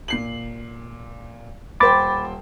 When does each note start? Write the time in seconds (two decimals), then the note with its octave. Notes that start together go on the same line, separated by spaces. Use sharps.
0.08 A#2 C7 F#7
1.80 D#1 C5 G5 B5 D6 A6